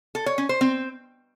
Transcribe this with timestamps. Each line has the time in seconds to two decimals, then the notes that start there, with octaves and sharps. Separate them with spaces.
0.15 A4
0.26 C#5
0.38 C#4
0.49 C5
0.61 C4